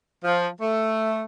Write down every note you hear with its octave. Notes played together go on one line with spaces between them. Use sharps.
F3
A3